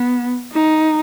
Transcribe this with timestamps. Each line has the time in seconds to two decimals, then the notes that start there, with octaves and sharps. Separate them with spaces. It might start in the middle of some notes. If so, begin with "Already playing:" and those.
Already playing: B3
0.53 D#4